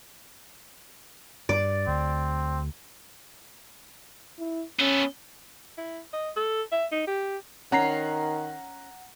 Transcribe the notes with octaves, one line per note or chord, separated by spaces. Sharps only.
G2 D5
D2 C4
E4
B3 C#4 A4
E4
D#5
A4
E5
D#4
G4
D#3 C#4 F#5 A#5 C7